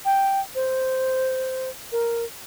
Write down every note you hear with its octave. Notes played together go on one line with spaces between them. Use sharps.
G5
C5
A#4